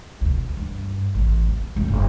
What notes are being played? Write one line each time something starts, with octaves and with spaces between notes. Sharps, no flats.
D2 B2
G2
A1
D1
F#2 A3
F#1